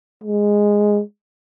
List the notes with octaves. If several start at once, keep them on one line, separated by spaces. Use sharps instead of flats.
G#3